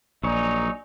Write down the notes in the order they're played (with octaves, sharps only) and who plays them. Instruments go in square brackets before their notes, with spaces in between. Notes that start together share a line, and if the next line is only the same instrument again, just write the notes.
[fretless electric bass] A#1 [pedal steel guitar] F#3 C#5 [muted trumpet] D#4 [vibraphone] D5 G#5